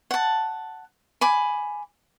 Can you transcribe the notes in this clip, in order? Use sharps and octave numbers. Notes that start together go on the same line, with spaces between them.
F#5 A5
G#5 B5 D6